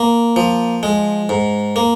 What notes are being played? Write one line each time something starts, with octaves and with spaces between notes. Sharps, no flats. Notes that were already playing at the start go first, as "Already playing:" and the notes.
Already playing: A#3
F3
G#3
G#2
A#3